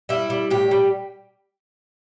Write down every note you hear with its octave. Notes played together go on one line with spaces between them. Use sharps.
G3 E4
G3
A2 G4
G3